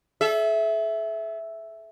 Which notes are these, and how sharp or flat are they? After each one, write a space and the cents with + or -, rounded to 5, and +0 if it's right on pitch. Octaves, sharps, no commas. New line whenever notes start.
A4 -45 E5 +0